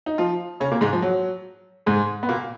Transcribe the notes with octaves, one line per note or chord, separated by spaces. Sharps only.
D#4
F3 F4
C#3 C#4
A#2 A#3
G#2 G#3
F3
F#3
G#2 G#3
B3
A#2 A#3